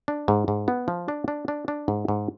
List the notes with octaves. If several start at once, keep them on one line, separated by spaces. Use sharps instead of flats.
D4
G#2
G#2
B3
F3
D4
D4
D4
D4
G#2
G#2